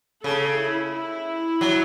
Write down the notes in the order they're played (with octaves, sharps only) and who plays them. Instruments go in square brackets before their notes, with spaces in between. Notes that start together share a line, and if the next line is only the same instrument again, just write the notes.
[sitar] C#3 [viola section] A4
[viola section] E4
E4
[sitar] F#3